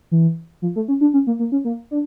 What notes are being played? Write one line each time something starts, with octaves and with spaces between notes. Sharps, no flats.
E3
F3
A3
C#4
D4
C#4
A#3
A#3
C#4
A#3
D4